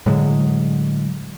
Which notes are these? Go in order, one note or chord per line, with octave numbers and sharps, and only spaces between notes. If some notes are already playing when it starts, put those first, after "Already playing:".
A2 D3 F#3 G#3